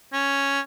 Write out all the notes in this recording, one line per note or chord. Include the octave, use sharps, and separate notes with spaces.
C#4